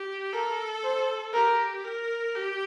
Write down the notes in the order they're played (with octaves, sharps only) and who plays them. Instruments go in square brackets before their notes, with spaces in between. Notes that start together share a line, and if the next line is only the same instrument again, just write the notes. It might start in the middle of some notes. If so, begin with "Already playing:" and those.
Already playing: [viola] G4
[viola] A4 [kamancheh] A#4
[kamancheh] C5
[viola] G4 [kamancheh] A#4
[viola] A#4
G4